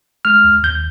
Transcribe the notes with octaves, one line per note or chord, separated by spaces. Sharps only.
G#3 F6
D#2
D#2 G6